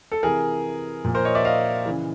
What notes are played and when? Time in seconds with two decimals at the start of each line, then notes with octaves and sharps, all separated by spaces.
0.12 A4
0.23 C3 E3 G#4 A#4
1.04 A#2 F3
1.14 A#4 C5
1.25 C#5 D#5
1.35 D5 E5
1.45 D#5 F5
1.86 C#3 E3